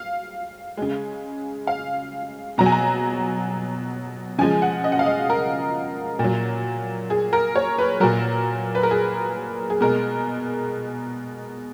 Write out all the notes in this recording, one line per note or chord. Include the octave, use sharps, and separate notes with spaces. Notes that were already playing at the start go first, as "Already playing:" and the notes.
Already playing: F5
C#3 G#3
F5
B2 F#3 A#5
G#5
A#5
C#3 F3 G#3 G#5
F#5
D#5
F#5
F5
D#5
A#4
A#2
F#3
G#4
A#4
C#5
B4
A#2 F#3 A#4
B4
A#4
G#4
G#4
B2 G#3 A#4